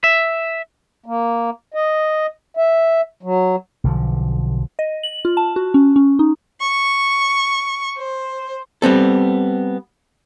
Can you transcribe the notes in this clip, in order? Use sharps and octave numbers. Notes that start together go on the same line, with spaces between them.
E5
A#3
D#5
E5
F#3
B1 D3 F3
D#5
F#7
F4
A5
F#4
C#4
C#4
D#4
C#6
C5
G3 B3 C4 A4